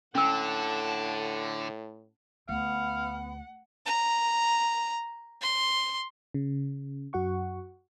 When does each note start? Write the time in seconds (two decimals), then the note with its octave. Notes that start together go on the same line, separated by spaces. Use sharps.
0.15 A2 D3 C#4 F#5 A5 E6
2.49 D2 B3 F5 F#5
3.86 A#5
5.41 C6
6.34 C#3
7.13 F#2 F#4 F#5 C#6